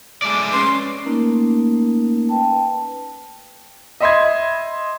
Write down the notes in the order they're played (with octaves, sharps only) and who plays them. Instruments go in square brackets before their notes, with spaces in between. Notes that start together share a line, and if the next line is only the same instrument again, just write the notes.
[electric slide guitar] G#3 A3 D5 [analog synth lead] D6
[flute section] C#4 B4 [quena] C6
[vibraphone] A3 A#3 C#4 D#4 A#4
B4 G5 A5
[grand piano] D#5 E5 B5 C6 D#6 G#6